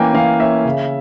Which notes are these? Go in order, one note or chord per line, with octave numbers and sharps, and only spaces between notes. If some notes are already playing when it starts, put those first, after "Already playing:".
Already playing: E3 A#3 C#4 G5 G#5
E3 F5
A#3 C#4 E5
C#3